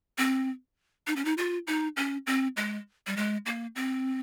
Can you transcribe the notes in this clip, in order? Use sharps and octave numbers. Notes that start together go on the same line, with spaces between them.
C4
D#4
C#4
D#4
F4
D#4
C#4
C4
G#3
G3
G#3
A#3
C4